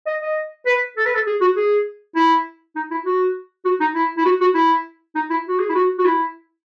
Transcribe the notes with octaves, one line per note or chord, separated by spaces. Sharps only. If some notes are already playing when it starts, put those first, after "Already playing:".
D#5
D#5
B4
A4
B4
A4
G#4
F#4
G#4
E4
D#4
E4
F#4
F#4
D#4
E4
E4
F#4
F#4
E4
D#4
E4
F#4
G#4
E4
F#4
F#4
E4